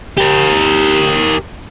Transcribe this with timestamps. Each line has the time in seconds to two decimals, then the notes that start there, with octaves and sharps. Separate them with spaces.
0.17 G4 A#4